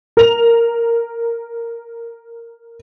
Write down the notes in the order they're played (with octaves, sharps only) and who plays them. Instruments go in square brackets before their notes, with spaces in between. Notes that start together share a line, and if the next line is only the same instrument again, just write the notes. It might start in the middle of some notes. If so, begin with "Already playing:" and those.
[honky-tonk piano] A#4 F7